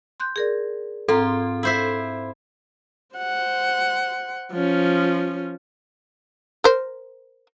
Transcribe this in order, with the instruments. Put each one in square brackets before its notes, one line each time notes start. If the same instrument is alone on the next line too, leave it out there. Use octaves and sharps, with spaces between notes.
[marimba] C6 F#6 G6
G#4 A#4 D5
[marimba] G#2 C4 A#5 [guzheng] F4 [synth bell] A4
[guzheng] E4 C5 E5
[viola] C5 F#5
F3 C#4
[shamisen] A#4 C5